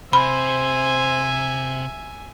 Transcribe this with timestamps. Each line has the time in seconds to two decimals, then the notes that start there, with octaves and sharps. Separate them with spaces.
0.13 C3 C5 E5 G#5 B5